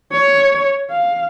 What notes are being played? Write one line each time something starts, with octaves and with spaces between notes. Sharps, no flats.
C#5
F5